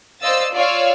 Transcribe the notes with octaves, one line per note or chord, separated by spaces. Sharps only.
C5 D5 D#5 F5 E6 A6
F4 C#5 D5 F5 E6 F6